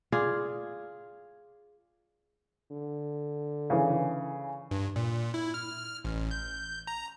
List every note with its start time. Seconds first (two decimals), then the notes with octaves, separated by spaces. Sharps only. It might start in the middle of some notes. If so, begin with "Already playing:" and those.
0.12 F4 G#4 D5
2.72 D3
3.70 C#3 E3
4.71 G2
4.96 A#2
5.34 E4
5.54 F6
6.05 A1
6.31 G6
6.87 A#5